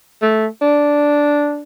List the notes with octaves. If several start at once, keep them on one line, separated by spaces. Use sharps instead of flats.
A3
D4